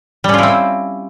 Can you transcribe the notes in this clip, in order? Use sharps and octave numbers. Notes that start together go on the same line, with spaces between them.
G3 C4 C#4 E4 F4